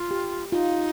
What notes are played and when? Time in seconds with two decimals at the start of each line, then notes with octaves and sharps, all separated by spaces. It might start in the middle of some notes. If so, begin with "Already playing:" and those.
Already playing: F4
0.11 G4
0.52 D#4 F4